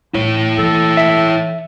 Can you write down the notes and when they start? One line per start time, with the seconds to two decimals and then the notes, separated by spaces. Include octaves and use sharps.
0.14 A1 A3 E4 C#5
0.58 E3 A4
0.97 E5